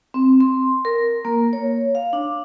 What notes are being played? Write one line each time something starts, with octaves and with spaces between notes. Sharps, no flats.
C4
C6
A#4
A#3
C#5
F5
D4